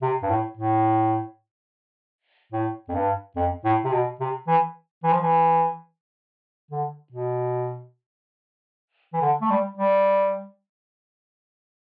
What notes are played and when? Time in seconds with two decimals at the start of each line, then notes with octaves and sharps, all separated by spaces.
0.02 C3
0.23 G2
0.30 A2
0.57 A2
2.52 A2
2.89 F2
2.95 G2
3.36 F2
3.65 A2
3.85 C3
3.92 B2
4.20 C3
4.47 E3
5.04 E3
5.12 F3
5.21 E3
6.71 D3
7.12 B2
9.13 E3
9.22 D3
9.41 A3
9.50 G3
9.78 G3